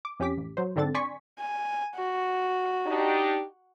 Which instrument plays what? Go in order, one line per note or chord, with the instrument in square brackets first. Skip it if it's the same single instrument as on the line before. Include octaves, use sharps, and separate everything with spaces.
[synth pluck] D6
F2 C#4 G4 D6 B6
A1
F#3 C5
G#2 D3 C4 D4 A4 A6
D5 G#5 C6 C#6 B6
[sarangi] G#5
F#4
[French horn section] D4 D#4 G4